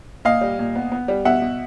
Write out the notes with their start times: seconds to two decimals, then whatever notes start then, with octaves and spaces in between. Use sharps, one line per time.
0.25 A#2 D#5 F5
0.41 G3
0.59 A#2
0.75 B3
0.92 B3
1.08 G3
1.25 B2 E5 F#5
1.42 B2